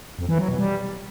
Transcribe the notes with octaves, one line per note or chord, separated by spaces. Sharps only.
F2
E3
F#3
B2
G3